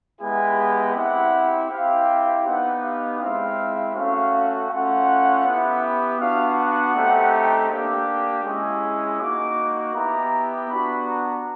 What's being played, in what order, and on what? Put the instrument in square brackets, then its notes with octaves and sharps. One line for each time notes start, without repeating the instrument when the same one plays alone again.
[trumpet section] G#3 B3 E4 G4 G#5
C4 E4 G4 F#5
C4 E4 G4 F5
B3 D#4 G4 F#5
F5
G#3 C4 E4 F5
A3 C#4 F#4 F5
A3 C#4 F4 F#5
B3 E4 G4
B3 D4 F#4 F5
F#5
A3 C4 D#4 G4
A#3 D4 G4
G#3 C#4 E4
A#3 D#4 F#4 D6
B3 E4 G4 A#5
B3 D4 F#4 B5
A#5